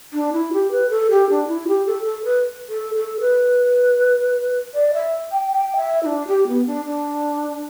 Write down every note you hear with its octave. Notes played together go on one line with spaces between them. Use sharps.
D4
E4
G4
B4
A4
G4
D4
E4
G4
A4
A4
B4
A4
A4
B4
D5
E5
G5
G5
E5
E4
D4
G4
B3
D4
D4